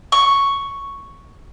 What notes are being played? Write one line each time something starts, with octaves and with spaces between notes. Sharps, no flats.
C#6